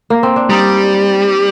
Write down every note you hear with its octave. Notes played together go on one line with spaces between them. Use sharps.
A#3
C4
D4
G3 D#4